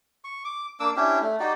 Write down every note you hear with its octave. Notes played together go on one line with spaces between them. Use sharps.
C#6
D6
A#3 D4 D6 E6
C#4 D4 E4 G4
A3
D#4 F#4 G4 D5